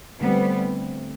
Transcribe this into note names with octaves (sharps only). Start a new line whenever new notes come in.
D3 G3 A3 B3 C4